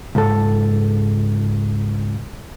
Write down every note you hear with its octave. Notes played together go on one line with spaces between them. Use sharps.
C#2 G#2 A4